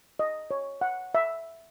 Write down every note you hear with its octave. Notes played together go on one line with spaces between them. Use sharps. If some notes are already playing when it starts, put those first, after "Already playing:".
D#5
C#5
F#5
E5